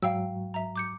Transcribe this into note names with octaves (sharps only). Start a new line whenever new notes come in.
G#2 F#3 F5 G5 E6
E5 A#5
D6 G6 C#7